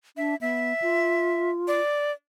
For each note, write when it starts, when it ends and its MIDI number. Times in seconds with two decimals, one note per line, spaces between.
0.17 0.35 62
0.17 0.36 76
0.41 0.73 59
0.41 1.50 76
0.82 1.79 65
1.68 2.11 74